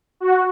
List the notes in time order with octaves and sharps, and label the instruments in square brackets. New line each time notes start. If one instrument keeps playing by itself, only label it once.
[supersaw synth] F#4